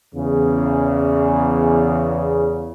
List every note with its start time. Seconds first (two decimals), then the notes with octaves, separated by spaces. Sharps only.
0.15 E2 C#3